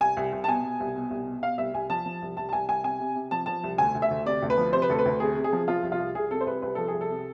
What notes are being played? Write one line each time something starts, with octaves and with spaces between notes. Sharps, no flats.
C2 G#5
C2
C2
A5
B2 G#5
B2
C2
B2
C2
B2
B2 F5
C2 E5
C2 G#5
F3 A5
F3
C2
C2 A5
A5
C2 G#5
C2 G#5
C3 G#5
C3
C3
F3 A5
F3 A5
C2
D2 G#5
D2
E5
D2
C3 D5
D2
B4
F3
C3 C5
B4
D2 A4
B4
D2
C3 G#4
C3
G#4
F3
F3 F4
C2
F4
C2
C2 G#4
C3 A4
C5
C2 B4
C2 B4
F3 A4
G#4
C2
A4
C3